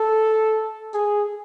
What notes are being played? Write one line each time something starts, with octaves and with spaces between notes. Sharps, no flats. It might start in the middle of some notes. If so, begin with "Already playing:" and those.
Already playing: A4
G#4